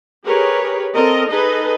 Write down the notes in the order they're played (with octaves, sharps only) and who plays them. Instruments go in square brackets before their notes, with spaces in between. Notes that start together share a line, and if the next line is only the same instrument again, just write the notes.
[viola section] G4 G#4 A#4 B4 C#5
C4 A4 A#4 D#5
D#4 G#4 A4 B4 D#5